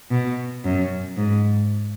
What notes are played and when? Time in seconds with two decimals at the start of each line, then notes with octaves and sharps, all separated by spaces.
0.11 B2
0.65 F#2
1.17 G#2